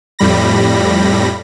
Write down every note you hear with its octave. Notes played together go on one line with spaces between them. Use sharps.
F2 A2 G3 B5 A#6